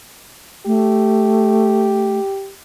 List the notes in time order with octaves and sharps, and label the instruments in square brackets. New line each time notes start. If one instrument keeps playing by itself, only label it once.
[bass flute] A3 [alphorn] G4